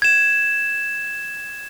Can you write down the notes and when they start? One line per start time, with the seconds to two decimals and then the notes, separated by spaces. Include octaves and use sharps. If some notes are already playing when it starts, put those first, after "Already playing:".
0.02 G#6 E7